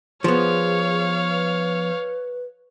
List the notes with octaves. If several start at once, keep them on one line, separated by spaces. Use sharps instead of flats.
F3 B3 G#4 C#5 F5
B4